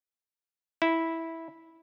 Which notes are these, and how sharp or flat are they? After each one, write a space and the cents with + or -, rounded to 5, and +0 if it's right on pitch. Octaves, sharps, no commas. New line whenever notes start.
E4 -10